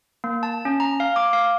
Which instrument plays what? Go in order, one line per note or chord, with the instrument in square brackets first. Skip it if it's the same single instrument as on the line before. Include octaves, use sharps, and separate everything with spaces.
[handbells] A#3
A5
C#4
A#5
F5
D6
F5